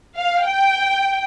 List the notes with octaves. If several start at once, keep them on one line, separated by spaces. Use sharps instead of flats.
F5
G5